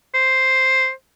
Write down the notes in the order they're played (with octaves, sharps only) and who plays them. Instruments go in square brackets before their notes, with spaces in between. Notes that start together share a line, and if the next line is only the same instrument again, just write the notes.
[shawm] C5